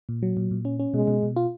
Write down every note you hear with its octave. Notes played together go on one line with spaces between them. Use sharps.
A#2
F#3
A#2
A#2
C#4
C#4
B2 G#3
B2
B2
F4